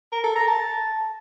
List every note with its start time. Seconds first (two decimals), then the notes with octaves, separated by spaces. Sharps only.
0.12 A#4
0.24 A4
0.36 A#5
0.48 A5